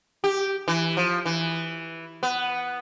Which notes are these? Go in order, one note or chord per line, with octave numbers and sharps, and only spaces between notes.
G4
E3
F3
E3
B3